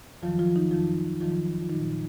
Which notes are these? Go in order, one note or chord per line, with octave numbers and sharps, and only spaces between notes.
F2 D#3 F3 F#3 F4
F3 F4
D#3 D#4
F2 D#3 F3 F#3 F4
F2 D#3 F3 F#3 F4
F4
A#2 D#3 F#3 D#4